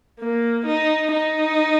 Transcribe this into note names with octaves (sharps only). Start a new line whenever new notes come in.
A#3
D#4
D#4